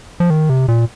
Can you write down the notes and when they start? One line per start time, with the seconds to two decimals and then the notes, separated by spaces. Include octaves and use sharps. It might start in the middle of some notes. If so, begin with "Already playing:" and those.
0.20 F3
0.30 D#3
0.49 C3
0.68 A#2